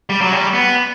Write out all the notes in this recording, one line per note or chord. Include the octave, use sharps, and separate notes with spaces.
G3
F#3
G3
B3